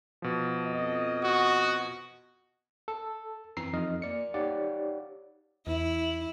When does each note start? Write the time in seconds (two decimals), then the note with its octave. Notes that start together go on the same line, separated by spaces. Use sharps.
0.22 B2 F3
0.65 F2 D#5
1.24 F#4
2.88 A4
3.57 F#2 E3 C4 A#5 E6 C7
3.73 F2 F3 D#4 D#5 F6
4.02 A#3 D5 C#7
4.34 D#4 G4 C#5 D5 F5 F#5
5.67 E2 E4